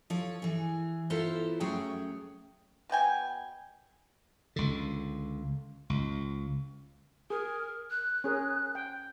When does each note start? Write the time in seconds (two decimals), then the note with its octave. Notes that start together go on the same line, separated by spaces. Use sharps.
0.10 F3 A4 C#5
0.42 E3 G#4
1.10 B3 E4 F4 A4 A#4 C5
1.60 F#2 F#3 A3 G#4 C#5 G5
2.89 B2 B4 G5 G#5
4.56 C#2 D3
5.90 C#2
7.30 G#4 A#4
7.91 F#6
8.24 C#4 G#4 A#4
8.75 G5